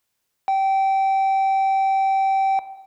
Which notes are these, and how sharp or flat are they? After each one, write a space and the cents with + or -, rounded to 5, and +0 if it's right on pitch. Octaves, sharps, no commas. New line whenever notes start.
G5 -20